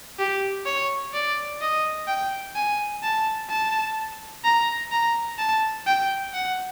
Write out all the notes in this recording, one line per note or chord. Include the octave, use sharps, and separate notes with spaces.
G4
C#5
D5
D#5
G5
G#5
A5
A5
A#5
A#5
A5
G5
F#5